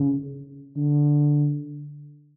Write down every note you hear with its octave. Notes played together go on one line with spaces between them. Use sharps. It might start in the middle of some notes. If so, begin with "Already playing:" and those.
Already playing: C#3
D3